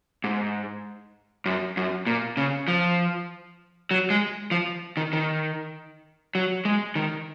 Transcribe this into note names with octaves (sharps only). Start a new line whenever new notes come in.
G#2
F#2
F#2
A#2
C#3
F3
F#3
G#3
F3
D#3
D#3
F#3
G#3
D#3